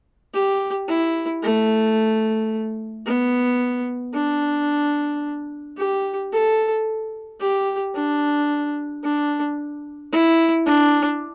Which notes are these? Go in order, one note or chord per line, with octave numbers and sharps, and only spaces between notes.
G4
E4
A3
B3
D4
G4
A4
G4
D4
D4
E4
D4